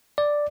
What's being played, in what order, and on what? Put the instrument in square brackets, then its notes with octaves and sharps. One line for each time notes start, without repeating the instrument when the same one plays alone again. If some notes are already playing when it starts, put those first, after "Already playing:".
[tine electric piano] D5